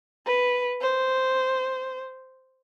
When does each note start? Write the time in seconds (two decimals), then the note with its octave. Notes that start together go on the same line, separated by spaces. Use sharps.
0.26 B4
0.82 C5